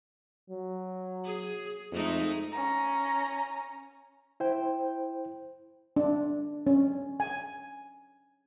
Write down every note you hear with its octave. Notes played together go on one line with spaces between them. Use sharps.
F#3
G#4
F2 G#3 A3 D#4
C#4 A#5
E4 C5 G5
D4
C#4
G#5